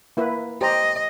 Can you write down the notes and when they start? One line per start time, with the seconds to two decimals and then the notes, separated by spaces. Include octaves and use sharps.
0.17 A#3 E4 B4
0.61 G4 C5 D#5 A#5